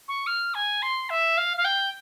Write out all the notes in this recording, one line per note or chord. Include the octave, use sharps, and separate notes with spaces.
C#6
F6
G#5
C6
E5
F5
F5
G5